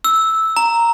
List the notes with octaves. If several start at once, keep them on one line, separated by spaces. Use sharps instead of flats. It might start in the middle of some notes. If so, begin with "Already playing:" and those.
E6
A#5